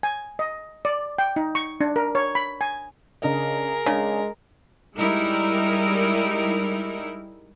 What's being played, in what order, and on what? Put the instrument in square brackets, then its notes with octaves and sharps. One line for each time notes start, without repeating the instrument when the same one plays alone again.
[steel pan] G#5
D#5
D5
G5
D#4
C#6
D4
A#4
C#5
B5
G#5
[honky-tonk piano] C#3 D4 D#5 [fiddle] G#4 A#4
[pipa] C#3 [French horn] G#3 [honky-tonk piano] D4
[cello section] G3 G#3 D#4 E4 A#4